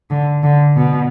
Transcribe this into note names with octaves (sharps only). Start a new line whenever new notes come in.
D3
D3
B2